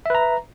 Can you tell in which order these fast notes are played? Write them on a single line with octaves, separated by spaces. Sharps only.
E5 B4 A#5